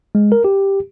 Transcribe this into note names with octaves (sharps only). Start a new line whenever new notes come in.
G#3
A#4
G4